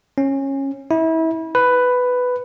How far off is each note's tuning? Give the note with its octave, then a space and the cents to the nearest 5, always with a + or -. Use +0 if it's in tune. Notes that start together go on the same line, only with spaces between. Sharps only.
C#4 -20
E4 -30
B4 +10